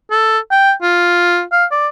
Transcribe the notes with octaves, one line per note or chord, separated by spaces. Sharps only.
A4
G5
F4
F5
D5